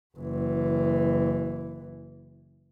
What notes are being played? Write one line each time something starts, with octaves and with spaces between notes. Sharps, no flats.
F#1 E3